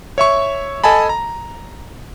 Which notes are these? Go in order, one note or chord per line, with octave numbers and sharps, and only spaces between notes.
C#5 E5 C#6
A4 D#5 G#5 A5 B5
A#5